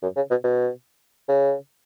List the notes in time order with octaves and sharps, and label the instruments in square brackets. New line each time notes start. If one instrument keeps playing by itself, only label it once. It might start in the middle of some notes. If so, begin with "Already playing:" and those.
[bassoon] F#2
C#3
B2
B2
C#3